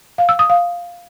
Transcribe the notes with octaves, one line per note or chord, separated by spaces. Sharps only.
F5
E6
D#6
F5